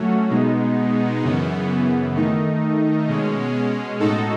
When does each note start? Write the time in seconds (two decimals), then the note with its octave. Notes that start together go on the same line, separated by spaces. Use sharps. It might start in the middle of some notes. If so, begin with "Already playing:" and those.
Already playing: F#3 A3 C#4 F#4
0.29 B2 G#3 B3 D#4
1.22 F#2 C#3 E3 B3
2.15 D#3 A3 D#4
3.07 B2 G#3 C#4
3.99 A2 G#3 D#4 F#4 A4